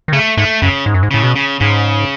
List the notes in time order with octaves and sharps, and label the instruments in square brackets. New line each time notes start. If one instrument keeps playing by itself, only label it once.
[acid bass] D#3
[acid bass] C#3 [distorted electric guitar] A3
[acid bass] G#2 [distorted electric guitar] A3
[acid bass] F#2 [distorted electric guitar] C#3
[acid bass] G#2
F#2
G#2
[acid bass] A2 [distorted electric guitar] C#3
[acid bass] B2
[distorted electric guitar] C#3
[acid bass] G#2 [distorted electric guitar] C#3